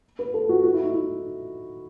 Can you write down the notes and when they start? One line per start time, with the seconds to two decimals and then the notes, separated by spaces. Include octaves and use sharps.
0.19 B4
0.34 A4
0.49 F#4
0.63 F#4
0.73 E4
0.83 D#4
0.94 E4